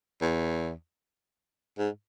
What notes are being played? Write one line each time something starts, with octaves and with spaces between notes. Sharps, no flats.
E2
G#2